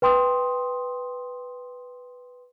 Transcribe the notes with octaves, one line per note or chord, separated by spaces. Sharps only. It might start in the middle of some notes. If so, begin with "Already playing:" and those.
B4 G5 C6 D#6